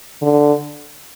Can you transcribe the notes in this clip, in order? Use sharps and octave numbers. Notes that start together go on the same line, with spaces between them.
D3